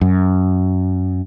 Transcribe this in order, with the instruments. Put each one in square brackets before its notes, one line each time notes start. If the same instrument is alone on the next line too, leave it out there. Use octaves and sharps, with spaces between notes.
[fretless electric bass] F#2